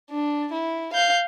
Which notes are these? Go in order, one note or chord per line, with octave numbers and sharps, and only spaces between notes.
D4
E4
F5 G6